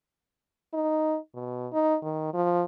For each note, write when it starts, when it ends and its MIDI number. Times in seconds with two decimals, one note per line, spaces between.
0.74 1.17 63
1.34 1.68 47
1.72 1.96 63
2.03 2.31 51
2.34 2.64 53